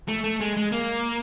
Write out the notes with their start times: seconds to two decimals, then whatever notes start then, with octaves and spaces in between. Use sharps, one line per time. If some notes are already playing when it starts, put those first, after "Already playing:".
0.08 A3
0.24 A3
0.40 G#3
0.57 G#3
0.72 A#3